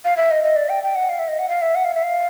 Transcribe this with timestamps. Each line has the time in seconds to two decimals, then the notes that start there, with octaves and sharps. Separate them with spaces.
0.05 F5
0.17 E5
0.31 D#5
0.44 D#5
0.56 D5
0.69 G5
0.83 G5
0.95 F#5
1.09 F5
1.19 E5
1.28 D#5
1.39 F#5
1.49 F5
1.62 E5
1.75 F#5
1.85 F5
1.94 E5
2.03 F5